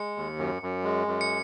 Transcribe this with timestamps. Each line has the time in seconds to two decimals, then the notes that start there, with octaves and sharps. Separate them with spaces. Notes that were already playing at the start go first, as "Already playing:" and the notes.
Already playing: G#3 C#7
0.16 D#2
0.39 F#2
0.62 F#2
0.84 G#3
1.07 F#2
1.21 C#7